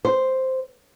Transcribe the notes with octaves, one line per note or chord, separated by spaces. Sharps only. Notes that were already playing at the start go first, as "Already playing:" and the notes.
C5